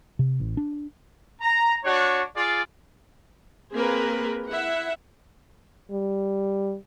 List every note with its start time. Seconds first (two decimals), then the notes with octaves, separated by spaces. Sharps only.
0.19 C3
0.40 A1
0.57 D4
1.41 A#5
1.83 D4 F#4 C#5
2.34 F4 G#4 D5
3.74 A#3 C4 G#4 A#4 B4
4.50 E4 E5 F#5
5.91 G3